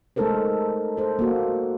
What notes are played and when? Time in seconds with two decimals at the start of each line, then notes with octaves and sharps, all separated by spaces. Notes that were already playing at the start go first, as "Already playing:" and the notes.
0.16 G#3 A3 D#4 A4 A#4 C5
0.97 A4 C5
1.19 A#3 F#4